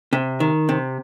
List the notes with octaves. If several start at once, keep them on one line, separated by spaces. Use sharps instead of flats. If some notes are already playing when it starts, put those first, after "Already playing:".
C3
D#3
C3